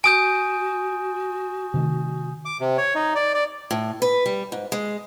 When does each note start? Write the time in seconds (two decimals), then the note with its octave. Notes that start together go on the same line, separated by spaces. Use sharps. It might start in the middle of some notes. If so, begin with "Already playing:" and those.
0.04 F#4 G#5 D#6 G6 D7
1.74 C3 D#3 A3
2.46 D6
2.61 C3
2.78 C#5
2.95 D#4
3.15 D5
3.34 D5
3.71 A2
4.02 B4
4.26 G3
4.52 G#2
4.72 G#3